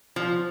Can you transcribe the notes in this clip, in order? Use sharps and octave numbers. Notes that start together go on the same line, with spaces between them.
F3